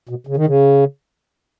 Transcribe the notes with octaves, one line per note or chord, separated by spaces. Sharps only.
B2
C#3
D#3
C#3